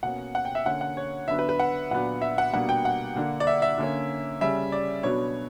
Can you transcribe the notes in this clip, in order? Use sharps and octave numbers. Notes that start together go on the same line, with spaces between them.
B2 A#3 C#4 F#5
F#5
G5
E5
D3 A#3 C#4 F#5
F#5
C#5
D3 F#3 B3 D4 E5
B4
B4
F#5
A#2 F#3 B3 D4 F#5
E5
F#5
B2 G3 A#3 D4 F#5
G5
F#5
D3 A#3 D4
D5
E5
E5
D3 A#3 C#4
C#3 G3 C#4 E5
D5
B2 F#3 B3 D4 C#5